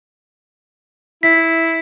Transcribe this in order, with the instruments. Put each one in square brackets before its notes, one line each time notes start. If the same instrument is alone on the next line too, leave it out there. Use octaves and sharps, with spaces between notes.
[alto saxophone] E4 [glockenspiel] B6